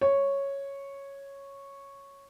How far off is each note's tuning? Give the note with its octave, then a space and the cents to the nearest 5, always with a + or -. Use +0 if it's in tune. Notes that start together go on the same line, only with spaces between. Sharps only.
C#5 -5